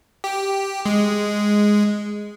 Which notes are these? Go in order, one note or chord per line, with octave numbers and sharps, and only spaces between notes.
G4
G#3